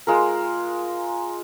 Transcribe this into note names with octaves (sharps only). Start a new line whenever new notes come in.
G#3 F4 A#4